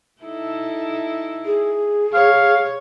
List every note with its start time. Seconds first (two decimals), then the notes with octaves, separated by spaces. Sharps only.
0.22 D#4 E4 A4
1.45 G#4
2.14 C#5 F5